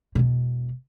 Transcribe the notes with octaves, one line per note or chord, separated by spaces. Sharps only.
E1 B2